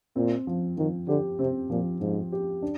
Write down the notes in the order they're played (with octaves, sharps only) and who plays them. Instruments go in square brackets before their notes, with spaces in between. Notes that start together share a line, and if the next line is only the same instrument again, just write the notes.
[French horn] A#2 [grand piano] C4
[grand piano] F3
[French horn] D#3 [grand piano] F3
[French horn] D3 [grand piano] G4
[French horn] C3 [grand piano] C4
[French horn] A#2 [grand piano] F3
[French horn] G#2 [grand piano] F3
[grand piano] G4
D4